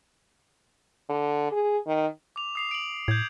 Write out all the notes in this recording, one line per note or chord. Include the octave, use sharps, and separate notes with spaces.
D3
G#4
D#3
D6 F7
D#6 C7 F7
D7 F#7
A2 G6 G#6